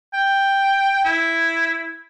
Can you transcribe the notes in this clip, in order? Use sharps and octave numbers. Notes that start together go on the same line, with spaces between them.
G5
E4